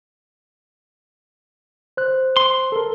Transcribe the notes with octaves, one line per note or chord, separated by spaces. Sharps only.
C5 F#6
C6
A4 A#4